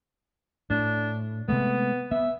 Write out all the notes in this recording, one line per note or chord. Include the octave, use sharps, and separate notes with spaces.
A2 D4
C3 G#3 A3 B3
B3 E5